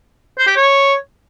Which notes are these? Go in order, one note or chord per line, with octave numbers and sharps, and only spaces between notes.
C5
G4
C#5